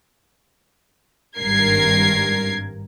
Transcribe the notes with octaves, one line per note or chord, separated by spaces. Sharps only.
G#1 G2 A#4 G#6 C7